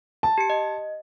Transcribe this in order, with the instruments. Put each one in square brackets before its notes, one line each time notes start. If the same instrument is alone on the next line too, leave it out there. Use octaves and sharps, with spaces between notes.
[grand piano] A5
[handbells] G4 C#7
D#5